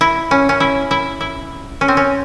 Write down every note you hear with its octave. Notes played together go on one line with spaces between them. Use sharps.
E4
C#4
C#4
E4
E4
E4
C#4
C4
C#4